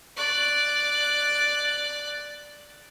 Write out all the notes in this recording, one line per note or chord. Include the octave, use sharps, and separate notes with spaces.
D5 F#6